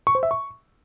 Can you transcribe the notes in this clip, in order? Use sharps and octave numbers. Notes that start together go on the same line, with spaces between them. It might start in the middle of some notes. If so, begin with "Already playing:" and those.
C#6
C5
E5
C#6